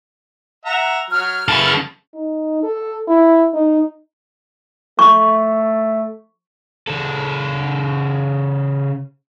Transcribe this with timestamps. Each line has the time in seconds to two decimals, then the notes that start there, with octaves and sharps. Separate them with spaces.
0.66 E5 F#5 A#5
1.10 F#3 F6
1.48 C#3 E4 A4 B4 A5
2.14 D#4
2.63 A4
3.08 E4
3.54 D#4
4.99 A3 C#6
6.88 C#3 A4